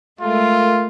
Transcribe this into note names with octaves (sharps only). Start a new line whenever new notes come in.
G#3 A3 F4 A#4